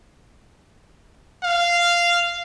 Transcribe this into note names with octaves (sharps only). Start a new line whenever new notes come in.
F5